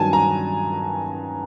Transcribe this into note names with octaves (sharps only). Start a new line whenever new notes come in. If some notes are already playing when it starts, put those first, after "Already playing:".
Already playing: G2 D#3 F#3 G#5 A5
A#5